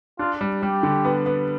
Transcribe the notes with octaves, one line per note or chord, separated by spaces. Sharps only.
D4 F4
G3
G3 G4
D3
B3
B3